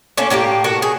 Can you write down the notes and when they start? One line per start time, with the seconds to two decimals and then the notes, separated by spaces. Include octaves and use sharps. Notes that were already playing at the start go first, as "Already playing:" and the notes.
0.17 A3 A#3 C#4 A4
0.30 A2 A#3 D#4 G4
0.64 F#4 A4 A#4
0.82 G#4